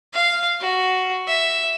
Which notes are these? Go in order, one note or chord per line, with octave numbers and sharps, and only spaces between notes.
F5
F#4
E5